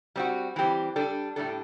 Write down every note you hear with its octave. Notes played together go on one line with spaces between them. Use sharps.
G3 C4 F#4
E3 G3 C4 G4
G3 D4 A4
A2 G3 D4 A4